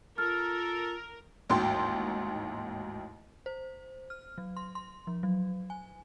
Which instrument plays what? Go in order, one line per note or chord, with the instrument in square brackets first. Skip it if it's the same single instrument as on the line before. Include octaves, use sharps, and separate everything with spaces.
[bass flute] F4 [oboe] A4 [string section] A#4 [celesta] F6
[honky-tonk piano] A1 D#2 G#2 F#4 G5 C6
[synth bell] C5
F6
F#3
C6
C6
F3
F#3
G#5